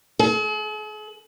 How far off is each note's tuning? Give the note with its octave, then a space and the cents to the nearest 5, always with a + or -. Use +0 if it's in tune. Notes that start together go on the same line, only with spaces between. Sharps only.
G#4 +45